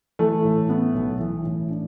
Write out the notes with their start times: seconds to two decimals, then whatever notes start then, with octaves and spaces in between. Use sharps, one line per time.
0.19 E3 A3
0.44 A2
0.69 B3
0.94 B1
1.20 E3
1.44 A2
1.70 D4